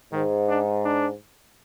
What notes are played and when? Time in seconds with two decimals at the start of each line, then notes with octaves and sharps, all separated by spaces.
0.12 G#2 D#3
0.48 D4
0.85 D4